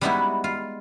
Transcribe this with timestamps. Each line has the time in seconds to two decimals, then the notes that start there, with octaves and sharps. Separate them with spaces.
0.01 G3 G#3 B3 D#4 E4 F#4
0.44 F4